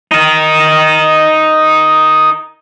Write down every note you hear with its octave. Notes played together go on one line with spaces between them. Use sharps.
D#4 A#4